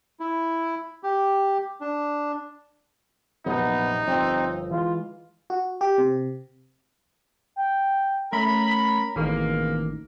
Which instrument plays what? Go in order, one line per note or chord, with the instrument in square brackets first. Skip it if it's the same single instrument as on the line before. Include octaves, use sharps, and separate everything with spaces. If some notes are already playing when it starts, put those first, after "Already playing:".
[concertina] E4
G4
D4
[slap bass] A#1 F#2 C3 [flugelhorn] B3 [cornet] D#4
[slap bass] G1 F3 [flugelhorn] C4
[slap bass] E3 G#3 [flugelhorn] F4
[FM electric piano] F#4
G4
C3
[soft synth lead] G5
[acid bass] A3 [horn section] C#4 A#4 B5 [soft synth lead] A#5
[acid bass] A1 [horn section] B2 G#3 A#3 [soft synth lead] D#3